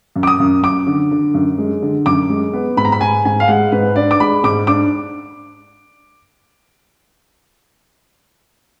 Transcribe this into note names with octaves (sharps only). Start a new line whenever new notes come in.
F#2
D6
D#6
F#2
F#2 D6
D3
D3
F#2
G#3
D3
F#2 D6
G#3
B3
G#2 B5
A#5
B5
G#2 G#5
G#2 G#5
F5
G#3 F#5
G#2 B4
D4 D5
D6
G#3 B5
G#2 D6
D4 D6